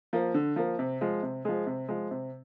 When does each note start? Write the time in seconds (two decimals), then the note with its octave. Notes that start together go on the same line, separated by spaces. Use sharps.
0.13 F3 A#3
0.34 D3
0.56 F3 A#3
0.79 C3
1.01 F3 G#3
1.23 C3
1.45 F3 G#3
1.67 C3
1.88 F3 G#3
2.11 C3